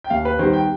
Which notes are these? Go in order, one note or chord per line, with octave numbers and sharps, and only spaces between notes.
G5
D#2 F5
B4
D#3 G3 B3 C5
G5